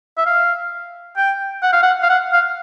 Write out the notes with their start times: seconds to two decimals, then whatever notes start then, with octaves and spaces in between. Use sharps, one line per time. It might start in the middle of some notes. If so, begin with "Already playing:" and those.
0.18 E5
0.26 F5
1.17 G5
1.63 F#5
1.73 F5
1.83 F#5
2.03 F5
2.10 F#5
2.33 F5